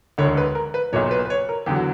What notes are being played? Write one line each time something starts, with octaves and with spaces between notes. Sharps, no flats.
E1 D2 D3 C#5
B4
A#4
B4
B1 A#2 F#3 C#5
B4
B4
C#5
A#4
E2 D3 F#3 G4
F#4